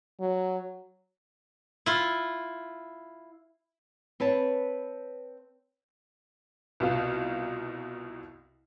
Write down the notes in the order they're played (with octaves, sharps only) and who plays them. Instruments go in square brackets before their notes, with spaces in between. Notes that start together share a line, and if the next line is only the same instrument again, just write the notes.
[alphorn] F#3
[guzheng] E4 F4
[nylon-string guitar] C4 B4 C#5 A5
[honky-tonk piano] C2 B2 F4 F5